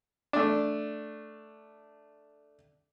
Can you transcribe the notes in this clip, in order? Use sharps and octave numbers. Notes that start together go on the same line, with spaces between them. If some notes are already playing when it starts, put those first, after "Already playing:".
A3 D4